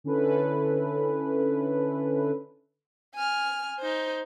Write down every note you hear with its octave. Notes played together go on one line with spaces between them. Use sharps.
D3 C#4 E4 A4 B4
G#5 F6
D#4 C5